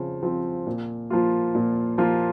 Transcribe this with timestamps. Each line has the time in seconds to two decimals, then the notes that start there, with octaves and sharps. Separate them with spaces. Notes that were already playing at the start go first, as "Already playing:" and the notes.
Already playing: C#3 F3 C4
0.23 F3 C4
0.67 A#2
1.10 F3 A#3 F4
1.55 A#2
1.98 F3 A#3 F4